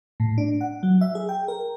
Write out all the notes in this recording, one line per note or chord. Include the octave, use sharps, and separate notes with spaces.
A2
D4
F#5
F#3
E5
G#4
G5
A#4